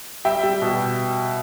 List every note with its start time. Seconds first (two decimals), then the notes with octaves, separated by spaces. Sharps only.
0.25 G3 E5 G5
0.43 G3
0.62 B2